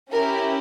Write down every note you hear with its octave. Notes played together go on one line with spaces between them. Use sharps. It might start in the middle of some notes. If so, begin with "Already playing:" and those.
C#4 E4 G4 A#4